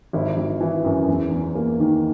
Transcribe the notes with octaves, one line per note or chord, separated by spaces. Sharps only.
G#1 E4
G#1
E3
F#2
E2
E2
A#3
D#3